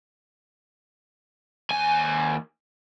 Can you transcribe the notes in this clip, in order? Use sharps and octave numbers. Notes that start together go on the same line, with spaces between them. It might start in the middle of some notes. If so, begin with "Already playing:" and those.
D#2 G#5